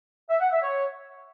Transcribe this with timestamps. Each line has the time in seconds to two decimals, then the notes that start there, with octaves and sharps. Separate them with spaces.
0.30 E5
0.40 F#5
0.51 E5
0.62 C#5